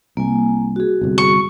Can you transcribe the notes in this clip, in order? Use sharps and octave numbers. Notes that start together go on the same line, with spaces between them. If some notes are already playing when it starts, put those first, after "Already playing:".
C2 A#3 G#5
F#4 G#4
G1 C2
C#6